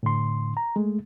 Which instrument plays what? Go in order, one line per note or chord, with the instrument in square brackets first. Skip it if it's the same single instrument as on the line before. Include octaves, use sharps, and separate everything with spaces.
[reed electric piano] A2 D3 C6
A#5
G#3 A3